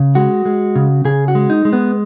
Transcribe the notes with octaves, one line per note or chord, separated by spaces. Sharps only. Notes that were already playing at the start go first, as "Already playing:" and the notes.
Already playing: C#3
G#3 F#4
G#3
C#3
C#3 G#4
F#4
G#3
D#4
G#3
B3